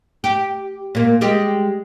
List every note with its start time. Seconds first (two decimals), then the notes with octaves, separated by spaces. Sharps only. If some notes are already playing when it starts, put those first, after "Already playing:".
0.24 G4
0.95 A#2 A#3
1.21 G3 G#3 G4